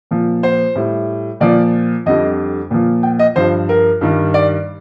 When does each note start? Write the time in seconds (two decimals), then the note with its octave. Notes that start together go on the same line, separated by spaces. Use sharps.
0.11 A#2 F3
0.43 C5
0.75 A2 G3
1.40 A#2 F3 D5
2.06 F2 D3 G3 D#5
2.71 A#2 F3
3.03 G5
3.19 D#5
3.36 G2 F3 C5
3.69 A#4
4.01 G2 D#3 G3
4.34 D5